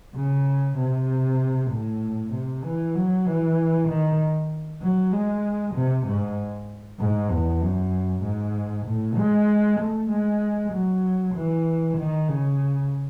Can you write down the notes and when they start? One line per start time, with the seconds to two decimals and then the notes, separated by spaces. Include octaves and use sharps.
0.15 C#3
0.77 C3
1.71 A2
2.33 C3
2.64 E3
2.95 F#3
3.26 E3
3.88 D#3
4.82 F#3
5.12 G#3
5.75 C3
6.06 G#2
6.99 G#2
7.30 E2
7.62 F#2
8.23 G#2
8.86 A2
9.17 G#3
9.80 A3
10.10 G#3
10.72 F#3
11.34 E3
11.97 D#3
12.28 C#3